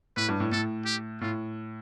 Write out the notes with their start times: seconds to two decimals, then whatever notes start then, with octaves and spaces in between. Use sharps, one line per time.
0.17 A2 B4
0.29 G2
0.40 A2
0.52 A2 A4
0.86 G4
1.21 A2 F4